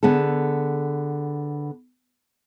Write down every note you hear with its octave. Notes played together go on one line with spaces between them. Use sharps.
D3 B3 G#4 A4